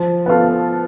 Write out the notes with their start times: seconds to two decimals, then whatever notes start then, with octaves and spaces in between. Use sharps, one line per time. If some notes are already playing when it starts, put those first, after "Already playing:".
Already playing: F3
0.26 B3 F4 A4